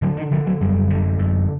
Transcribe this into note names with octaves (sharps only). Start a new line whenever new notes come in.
D3 F#3
D#3
D3 F3
F#3
F#2 G3
D3
F#2